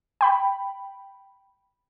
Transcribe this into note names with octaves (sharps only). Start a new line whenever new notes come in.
G5 B5